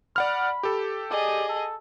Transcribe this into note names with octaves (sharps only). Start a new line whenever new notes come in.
D5 F#5 B5 F6
G4 A4
G#4 D5 D#5
A4